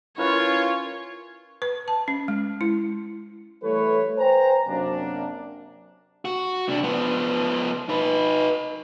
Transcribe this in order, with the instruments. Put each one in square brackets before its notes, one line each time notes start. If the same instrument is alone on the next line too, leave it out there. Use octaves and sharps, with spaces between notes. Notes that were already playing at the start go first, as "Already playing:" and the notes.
[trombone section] C#4 F4 [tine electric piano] E4 A#4 B4 [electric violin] C#5
[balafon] B4
A5
C#4
G#3
E4
[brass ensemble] E3 G3 A3 A4 B4 C#5
B4 C5 G5 G#5 A#5
F#2 C3 A#3 D4
[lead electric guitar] F#4
C3 D4
F3 B3
D#4 B4